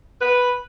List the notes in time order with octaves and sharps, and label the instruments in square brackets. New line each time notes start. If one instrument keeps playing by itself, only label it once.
[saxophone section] B4